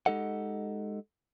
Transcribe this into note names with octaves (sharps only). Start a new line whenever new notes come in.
G#3 D#4 G4 A4 D#5 F#5